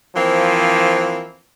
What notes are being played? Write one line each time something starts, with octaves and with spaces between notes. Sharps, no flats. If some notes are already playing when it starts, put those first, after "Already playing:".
E3 F3 A#3 C4